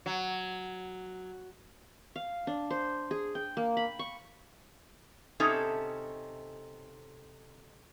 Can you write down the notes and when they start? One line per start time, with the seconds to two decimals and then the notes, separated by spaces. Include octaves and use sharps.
0.06 F#3
2.16 F5
2.47 D4
2.71 C5
3.11 G#4
3.35 G5
3.57 A#3
3.77 B5
3.99 C#6
5.40 C3 C#4 D#4 A4 E5